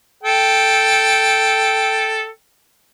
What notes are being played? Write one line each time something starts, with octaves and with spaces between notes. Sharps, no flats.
A4 G5